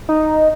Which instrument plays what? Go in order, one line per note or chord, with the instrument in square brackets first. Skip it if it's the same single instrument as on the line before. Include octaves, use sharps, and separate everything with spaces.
[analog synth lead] D#4